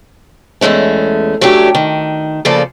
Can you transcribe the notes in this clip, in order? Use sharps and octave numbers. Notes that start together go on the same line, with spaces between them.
E2 G#2 G#3 A3 C#4
F#3 A3 C#4 D4 G4
D#3
D2 C#3 F3 A#3 A4 D5